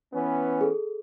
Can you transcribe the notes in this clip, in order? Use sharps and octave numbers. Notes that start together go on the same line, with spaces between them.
E3 B3 C#4
G#4 A4